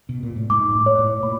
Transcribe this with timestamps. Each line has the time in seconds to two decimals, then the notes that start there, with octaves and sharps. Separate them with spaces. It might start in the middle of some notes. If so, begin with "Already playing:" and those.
0.09 B2
0.23 A#2
0.36 A2
0.50 G#2 D6
0.75 A2
0.86 C#5
0.98 A2
1.23 A#2 B5